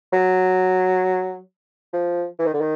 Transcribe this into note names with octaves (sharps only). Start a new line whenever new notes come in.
F#3
F3
E3
D#3
D3
D#3